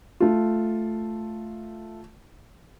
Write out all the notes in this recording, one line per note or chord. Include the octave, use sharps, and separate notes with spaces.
A3 F4